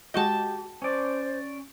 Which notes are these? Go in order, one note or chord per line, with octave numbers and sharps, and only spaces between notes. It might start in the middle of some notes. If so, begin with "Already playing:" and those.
G#3 F#4 G4 D#5 G5 A5
C#4 C5 D5